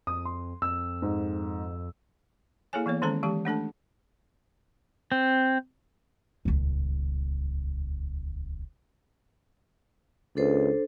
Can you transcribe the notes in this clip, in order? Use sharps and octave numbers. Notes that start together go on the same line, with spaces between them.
F2 D#6
C6
F2 E6
G#2
A#3 E4 G#4 A4 C#5 G#5
E3 A#3 B3 C#5
D#3 G#3 C#4 A4 C5 A#5
E3 G#3 G4 A5
A3 D4 A4 A5
C4
D#1 C#2
C#2 D4 A4 C5